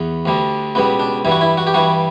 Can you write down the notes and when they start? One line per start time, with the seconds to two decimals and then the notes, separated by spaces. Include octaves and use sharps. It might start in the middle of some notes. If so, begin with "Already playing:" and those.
Already playing: E2 B3
0.26 D2 D3 G3
0.75 C#2 B2 G3 B3
1.00 D4
1.25 G2 E3 G3
1.31 F#4
1.41 E4
1.57 F#4
1.67 G4
1.74 G2 E3 G3 F#4